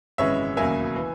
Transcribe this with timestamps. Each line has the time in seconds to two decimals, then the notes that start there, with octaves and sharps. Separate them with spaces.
0.18 G#1 F#2 C#3 E3 G#3 C#5 E5
0.57 E1 D#2 C#3 F#3 A#3 E5 G#5
0.96 E3